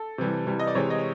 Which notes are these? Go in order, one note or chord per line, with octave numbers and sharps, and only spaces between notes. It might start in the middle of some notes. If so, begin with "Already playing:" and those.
Already playing: A4
C3 E3 G3
C3 E3 G3
D#5
D5
C3 E3 G#3 C#5
D#5